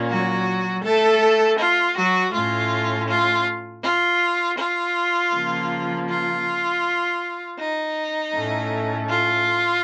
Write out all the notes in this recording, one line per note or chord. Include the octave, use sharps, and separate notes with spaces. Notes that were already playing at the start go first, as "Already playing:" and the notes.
Already playing: A#2 A#3 C#4
F#3 F#4
A3 A4
F4
F#3 F#4
A2 A3 C#4 F4
F4
F4
F4
C#3 F3 A#3
F4
D#4
A2 A3 C#4
F4